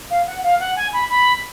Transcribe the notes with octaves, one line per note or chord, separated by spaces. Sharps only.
F5
F#5
F5
F#5
G#5
B5
B5